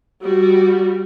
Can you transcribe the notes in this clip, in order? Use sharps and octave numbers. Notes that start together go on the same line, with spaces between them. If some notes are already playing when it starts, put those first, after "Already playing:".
G3 F#4